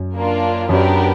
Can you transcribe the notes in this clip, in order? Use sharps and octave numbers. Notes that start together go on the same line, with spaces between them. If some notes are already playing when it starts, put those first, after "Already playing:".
Already playing: F#2
A#3 D4 F4
F#2 B3 D4 G4 A#4